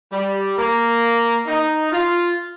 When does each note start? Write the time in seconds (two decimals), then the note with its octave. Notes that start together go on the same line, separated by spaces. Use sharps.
0.12 G3
0.57 A#3
1.47 D#4
1.91 F4